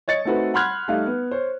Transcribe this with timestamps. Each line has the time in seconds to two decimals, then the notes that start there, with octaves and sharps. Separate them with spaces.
0.08 C#5 D#5 A6 C#7
0.25 A3 C4 D#4 F#4 A4 B4
0.54 F#5 B5 C6 F6 F#6 G#6
0.88 G3 A3 D#4 F5
1.06 B3
1.31 C5 C#5